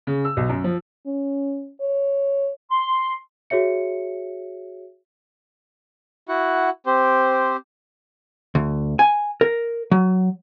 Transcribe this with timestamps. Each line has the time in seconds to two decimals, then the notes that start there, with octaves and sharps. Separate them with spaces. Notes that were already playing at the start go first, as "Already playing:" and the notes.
0.07 C#3
0.25 E6
0.37 B1
0.49 F#2
0.64 F3
1.06 C#4
1.81 C#5
2.71 C6
3.50 F#4 G#4 C#5 E5 C#7
6.29 E4 F#4 F#5
6.86 C4 G4 C5
8.55 D2
8.99 G#5
9.41 A#4
9.91 F#3